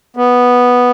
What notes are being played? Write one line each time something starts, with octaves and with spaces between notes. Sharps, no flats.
B3